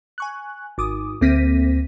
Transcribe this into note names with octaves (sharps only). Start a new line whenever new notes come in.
G#5 C#6 F#6
G#1 D6 D#6
D2 A#3 C4 A#6 B6 D#7